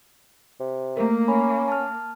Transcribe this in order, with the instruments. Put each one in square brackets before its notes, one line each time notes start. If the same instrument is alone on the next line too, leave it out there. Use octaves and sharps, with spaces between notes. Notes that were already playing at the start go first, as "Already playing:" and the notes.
[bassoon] C3
[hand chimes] A3 A#4 [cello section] A#3
[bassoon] C#4 [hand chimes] B5
[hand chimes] A5 F6